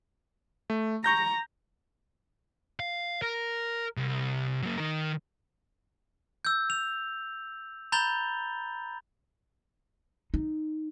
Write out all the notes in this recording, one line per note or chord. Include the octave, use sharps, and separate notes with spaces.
A3
A#5 C#6 G6 A#6
F5
A#4
C2
F#3 A#3
D#3 A#4
E6 G6
F7
A#5 B5 G6 A6 F7 G7
D#4